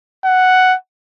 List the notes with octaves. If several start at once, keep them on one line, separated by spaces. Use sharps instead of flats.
F#5